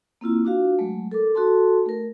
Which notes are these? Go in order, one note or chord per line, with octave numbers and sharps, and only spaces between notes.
A#3 C4 E4 F4
D4 F4 F#4 F5
F#3 G#3 A3
A4 A#4 D6
D#4 F#4 A4 A5 C6
A3 A#4